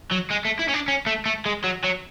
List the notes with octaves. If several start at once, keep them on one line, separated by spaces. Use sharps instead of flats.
F#3
G#3
A3
E4
C#4
D4
C#4
A3
A3
G#3
F#3
F#3